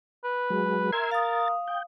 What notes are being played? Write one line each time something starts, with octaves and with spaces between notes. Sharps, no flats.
B4
F#3 G#3
A#4 E5 C6 G#6
F5 D#6 A6
G5